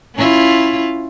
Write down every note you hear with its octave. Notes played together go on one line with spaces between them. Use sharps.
C#4 E4 F4